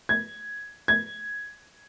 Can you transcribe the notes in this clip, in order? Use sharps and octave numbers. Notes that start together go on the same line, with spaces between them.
G#6
G#6